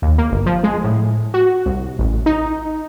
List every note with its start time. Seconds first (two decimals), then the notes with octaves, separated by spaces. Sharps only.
0.02 D#2
0.18 A#3
0.31 G1
0.46 F3
0.64 G#3
0.84 A2
1.34 F#4
1.66 C2
1.99 A1
2.26 D#4